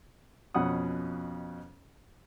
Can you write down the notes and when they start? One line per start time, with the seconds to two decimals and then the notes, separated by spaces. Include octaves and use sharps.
0.54 F2 B2 C#4 F#5 D#6